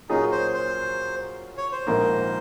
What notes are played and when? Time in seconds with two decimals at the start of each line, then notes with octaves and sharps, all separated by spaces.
0.09 A#2 F#3 C#4 D#4 G#4
0.32 C5
0.54 C5
1.57 C#5
1.72 C5
1.87 A#1 G#2 D#3 A#3